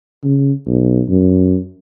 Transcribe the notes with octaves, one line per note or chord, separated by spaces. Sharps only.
C#3
B1
F#2